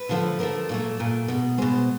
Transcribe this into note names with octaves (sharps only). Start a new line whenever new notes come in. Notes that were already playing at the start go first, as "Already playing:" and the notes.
Already playing: B4
D3 F3 A3
D3 F3 A3 A#4
A#2 F#3 A3
A#2 F#3 A3
B2 G#3
B2 G#3 C5